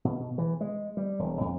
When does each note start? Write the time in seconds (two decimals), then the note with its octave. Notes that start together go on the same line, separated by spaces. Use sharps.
0.05 B2
0.38 E3
0.61 G#3
0.97 G3
1.19 E1
1.41 F2